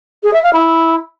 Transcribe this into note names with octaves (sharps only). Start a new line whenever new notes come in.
G#4
E5
F5
E4